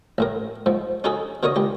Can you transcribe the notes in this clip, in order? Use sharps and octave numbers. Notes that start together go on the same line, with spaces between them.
A1 A2 A#4
G#2 F3
C#4 D#4 F#4 G#4 A4
B2 D3 A#4 C#5 D#5 D#6
C#2 G4